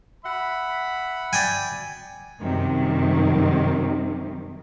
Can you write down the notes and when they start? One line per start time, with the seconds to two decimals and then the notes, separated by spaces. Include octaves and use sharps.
0.24 E5 F#5 B5
1.33 D5 G5 G#5
2.42 F#2 C3 D#3 G3